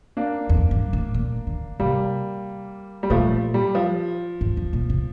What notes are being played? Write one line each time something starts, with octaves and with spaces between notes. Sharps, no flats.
A#3 D4
F2
G2
A2
A#2
D3
C3 G3 A#3
G3
A#2 F3 A3
G3
F3
G2
G2
A#2
C3